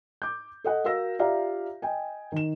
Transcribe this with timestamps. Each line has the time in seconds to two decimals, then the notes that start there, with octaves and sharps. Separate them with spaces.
0.22 D6 G6
0.64 A4 D#5 F#5
0.84 F#4 A#4 F5 E6 A#6
1.19 F4 G4 D5 E5 F5 A#5
1.82 D#5 G5 G#5
2.32 D#3 E7